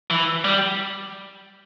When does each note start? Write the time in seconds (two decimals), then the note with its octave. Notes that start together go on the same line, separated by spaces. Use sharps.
0.10 E3
0.45 G3